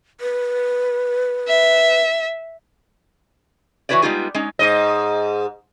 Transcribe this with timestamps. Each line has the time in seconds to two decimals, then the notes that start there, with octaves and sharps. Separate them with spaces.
0.21 B4
1.48 E5
3.89 E3 A#3 F#4 B4 C#5 D5
4.02 G3 G#3 B3 D#4 F4 G#4
4.34 G#3 C#4 D#4
4.59 G#2 D#5